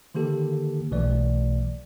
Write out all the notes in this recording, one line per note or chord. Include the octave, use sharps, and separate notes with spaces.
D3 D#3 A#3 G4 A4
B1 B2 E3 A3 D5